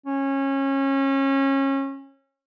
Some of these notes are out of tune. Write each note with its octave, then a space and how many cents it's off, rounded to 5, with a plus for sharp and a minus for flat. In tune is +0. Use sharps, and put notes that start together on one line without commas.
C#4 -25